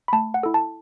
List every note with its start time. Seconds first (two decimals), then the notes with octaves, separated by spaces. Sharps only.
0.08 B5
0.13 A3 A5
0.34 F#5
0.43 E4 A4
0.54 A5